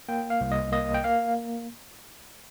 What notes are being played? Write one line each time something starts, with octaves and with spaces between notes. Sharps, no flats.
A#3 G5
F5
C2
D#5
A#3 D#5
G5
A#3 F5